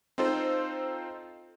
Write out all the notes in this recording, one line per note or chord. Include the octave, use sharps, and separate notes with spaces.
C4 D#4 F4 A4 C5